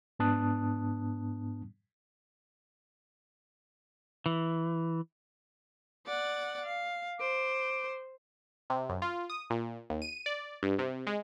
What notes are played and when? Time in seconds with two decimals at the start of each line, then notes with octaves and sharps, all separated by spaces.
0.19 G#2 B3 D4 A5 D#6 F#6
4.26 E3
6.06 D5 F#5
6.65 F5
7.20 C5 D6
8.70 C3
8.89 F#2
9.02 F4
9.30 D#6
9.50 A#2
9.90 D#2
10.02 D#7
10.26 D5
10.63 G2
10.79 C3
11.07 G#3